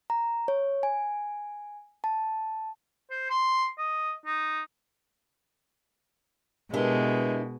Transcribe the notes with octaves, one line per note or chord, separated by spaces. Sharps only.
A#5
C#5
G#5
A5
C5
C6
D#5
D#4
B2 G#3 D4 E4 G4 A#4 B4 G7